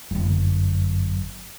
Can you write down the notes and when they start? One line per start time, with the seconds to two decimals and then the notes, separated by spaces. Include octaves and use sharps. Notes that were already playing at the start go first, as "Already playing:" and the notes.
0.11 G1 F#2